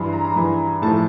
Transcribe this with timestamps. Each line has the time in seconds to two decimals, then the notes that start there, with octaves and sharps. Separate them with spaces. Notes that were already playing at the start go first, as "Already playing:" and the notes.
Already playing: G2 E3 C6
0.13 A#5
0.25 A#5
0.36 G2 E3
0.82 A2 F3 A5